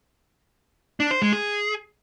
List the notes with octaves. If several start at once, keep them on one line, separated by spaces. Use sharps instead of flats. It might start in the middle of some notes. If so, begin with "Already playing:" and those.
D4
C5
G#3
G#4